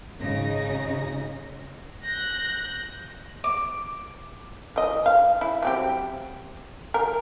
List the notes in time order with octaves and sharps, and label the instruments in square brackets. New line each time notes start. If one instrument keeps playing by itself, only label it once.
[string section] G#1 C#3 D#4 A#6
[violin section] F#6 G6 A#6
[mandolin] D6
[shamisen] E3 D#5
F5
E4
F#3 C4 G4
A#4